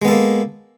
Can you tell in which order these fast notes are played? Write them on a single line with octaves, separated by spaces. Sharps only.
G#3 B3 A4 A#3